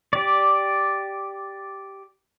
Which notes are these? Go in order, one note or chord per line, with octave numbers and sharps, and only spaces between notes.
G4 D5